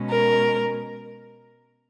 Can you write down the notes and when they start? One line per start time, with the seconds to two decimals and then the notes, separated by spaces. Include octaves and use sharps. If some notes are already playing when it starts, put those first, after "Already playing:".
Already playing: B2 G#3 C#4
0.10 A#4